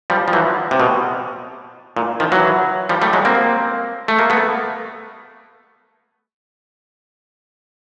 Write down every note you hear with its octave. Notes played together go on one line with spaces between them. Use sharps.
F3 G3
F3
E3 F#3
C3
B2
A#2
D#3 F3
E3 F#3
F3 G3
G3 A3
F#3 G#3
A#3 C4
A3
A#3
A3 B3